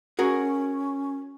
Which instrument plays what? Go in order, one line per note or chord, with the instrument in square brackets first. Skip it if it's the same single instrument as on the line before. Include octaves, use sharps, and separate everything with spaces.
[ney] C#4 [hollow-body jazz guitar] F#4 G#4 A#4